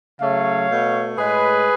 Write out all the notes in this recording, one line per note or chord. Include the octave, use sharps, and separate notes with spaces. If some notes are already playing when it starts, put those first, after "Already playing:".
C#3 F#3 A3 C#5 F5
B2 A3
A2 G#3 G#4 B4